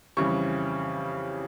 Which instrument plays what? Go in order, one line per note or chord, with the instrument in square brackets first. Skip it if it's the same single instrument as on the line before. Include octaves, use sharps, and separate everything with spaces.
[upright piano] F2 C#3 E3 G3 C#6